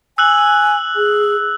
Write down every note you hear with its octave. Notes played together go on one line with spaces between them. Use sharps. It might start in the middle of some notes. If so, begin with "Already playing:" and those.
G#5 E6 F#6 F#7
G#4